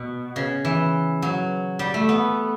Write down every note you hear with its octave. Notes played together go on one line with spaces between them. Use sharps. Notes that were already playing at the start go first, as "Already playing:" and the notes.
Already playing: B2
C#3
E3
F#3
G3
A3
B3